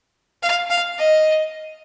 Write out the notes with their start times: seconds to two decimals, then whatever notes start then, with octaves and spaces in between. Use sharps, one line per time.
0.43 F5
0.70 F5
0.98 D#5